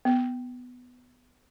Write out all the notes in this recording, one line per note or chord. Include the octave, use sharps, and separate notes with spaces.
B3